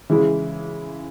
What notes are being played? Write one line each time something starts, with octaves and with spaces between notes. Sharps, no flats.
C#3 E3 G#3 E4 G#4